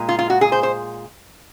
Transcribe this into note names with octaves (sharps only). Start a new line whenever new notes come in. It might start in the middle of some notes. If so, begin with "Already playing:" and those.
Already playing: A#2 G#3
F4
F4
F#4
G#4
C5
C5